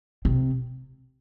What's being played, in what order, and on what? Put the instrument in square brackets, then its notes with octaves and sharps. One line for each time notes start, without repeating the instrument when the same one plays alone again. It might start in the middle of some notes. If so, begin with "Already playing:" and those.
[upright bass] C3